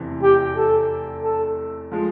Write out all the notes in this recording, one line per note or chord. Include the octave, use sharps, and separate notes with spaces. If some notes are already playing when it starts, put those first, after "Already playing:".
Already playing: F1 E2 C3 E3 A3
G4
A4
A4
F3 G#3